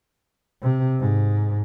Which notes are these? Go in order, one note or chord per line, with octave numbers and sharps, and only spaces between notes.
C3
G#2